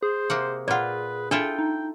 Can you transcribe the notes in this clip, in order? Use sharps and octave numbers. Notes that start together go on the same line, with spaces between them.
G#4 C5
C3 A#3 F#5
A#2 F4 B4 D5 F#5
D4 E4 F4 A4 G5
D#4